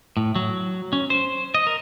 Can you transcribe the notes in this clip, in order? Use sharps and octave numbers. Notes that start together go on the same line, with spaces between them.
A2
F#3
C#4
C5
D#5
A#4